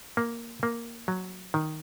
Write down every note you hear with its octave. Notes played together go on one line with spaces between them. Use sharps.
A#3
A#3
F#3
D#3